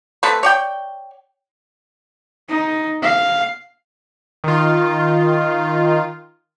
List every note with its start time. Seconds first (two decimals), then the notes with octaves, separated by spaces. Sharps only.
0.23 A3 C4 B4 B5
0.43 C#5 D5 G5
2.49 D#4
3.02 F5
4.44 D#3 F4